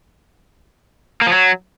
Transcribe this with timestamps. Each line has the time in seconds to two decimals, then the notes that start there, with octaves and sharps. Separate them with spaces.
1.21 A#3
1.27 F3
1.32 F#3